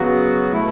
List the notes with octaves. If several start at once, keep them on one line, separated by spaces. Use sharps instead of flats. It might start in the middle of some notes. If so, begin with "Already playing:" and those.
Already playing: C#3 F#3 B3 F#4
B2 A3 E4